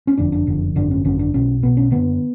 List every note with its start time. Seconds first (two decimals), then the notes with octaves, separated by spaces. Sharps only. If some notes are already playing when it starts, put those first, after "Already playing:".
0.07 C#4
0.18 F#1 F2 D3 D4
0.32 D4
0.47 F#1 F2 D3
0.75 G#1 F#2 D3 D4
0.91 C#4
1.04 G#1 F#2 D3 C#4
1.19 D4
1.34 B1 B2 C#4
1.63 B1 B2 B3
1.77 C#4
1.91 F#1 F2 D3 B3